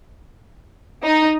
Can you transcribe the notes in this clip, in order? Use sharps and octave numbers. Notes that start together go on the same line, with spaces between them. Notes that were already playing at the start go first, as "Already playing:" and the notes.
D#4